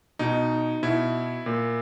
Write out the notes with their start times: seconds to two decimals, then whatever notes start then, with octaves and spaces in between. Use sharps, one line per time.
0.19 B2 D#4
0.83 B2 E4
1.46 A#2